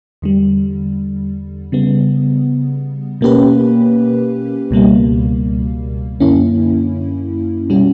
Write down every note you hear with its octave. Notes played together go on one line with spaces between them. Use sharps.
E2 D3 G3
C#3 G3 B3
B2 A#3 C#4 G4 B4
C#2 B2 G3 A#3
F#2 D3 A#3 C#4 E4
B2 G3 C#4 F#4